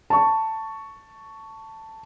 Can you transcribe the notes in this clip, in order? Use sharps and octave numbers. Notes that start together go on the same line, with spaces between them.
A5 C#6